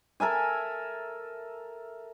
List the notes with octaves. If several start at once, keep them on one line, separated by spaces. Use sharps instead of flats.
A4 A#4 E5 G#5